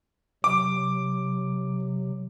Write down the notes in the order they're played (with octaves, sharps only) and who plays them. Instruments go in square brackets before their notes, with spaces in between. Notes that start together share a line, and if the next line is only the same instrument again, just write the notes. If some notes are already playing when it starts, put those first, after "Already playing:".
[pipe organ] C3 F#3 [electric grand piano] D6